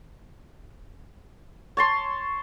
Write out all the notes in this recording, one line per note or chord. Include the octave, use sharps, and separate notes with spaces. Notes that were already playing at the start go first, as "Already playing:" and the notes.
C#5 A5 C6